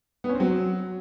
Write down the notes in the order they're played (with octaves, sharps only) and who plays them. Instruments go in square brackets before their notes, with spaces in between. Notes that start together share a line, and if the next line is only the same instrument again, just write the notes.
[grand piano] B3
C#4
C4
F#3